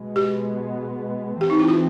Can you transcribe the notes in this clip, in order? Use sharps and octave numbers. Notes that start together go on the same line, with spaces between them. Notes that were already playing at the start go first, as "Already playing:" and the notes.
Already playing: B2 G#3 B3
G4
E3 A3 C4 G4
D#4
E4
F4